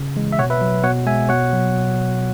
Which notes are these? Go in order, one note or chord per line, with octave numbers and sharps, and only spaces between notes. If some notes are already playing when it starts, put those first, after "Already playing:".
Already playing: C#3
E3 G#3
E5
B2 C#5 F#5
B4 E5
F#3
B2 C#5 F#5
G#3 E5 G#5
B2 C#5 F#5
F#3